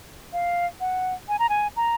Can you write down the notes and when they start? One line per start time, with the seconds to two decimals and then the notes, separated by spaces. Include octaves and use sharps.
0.33 F5
0.80 F#5
1.29 G#5
1.39 A#5
1.49 G#5
1.76 A#5